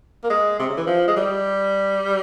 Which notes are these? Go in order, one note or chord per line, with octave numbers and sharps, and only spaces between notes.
A#3
G#3
C3
C#3
E3
F3
G#3
G3